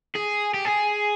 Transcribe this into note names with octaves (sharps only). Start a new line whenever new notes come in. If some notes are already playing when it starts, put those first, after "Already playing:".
G#4
G4
G#4